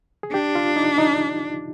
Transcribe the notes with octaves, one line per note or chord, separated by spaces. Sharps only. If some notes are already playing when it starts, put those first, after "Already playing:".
G#4
D4 G4
F4
D#4
D#4